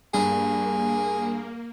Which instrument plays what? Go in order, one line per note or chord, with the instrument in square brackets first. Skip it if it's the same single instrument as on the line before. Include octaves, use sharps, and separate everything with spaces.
[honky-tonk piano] G2 [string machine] A#3 [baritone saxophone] G#4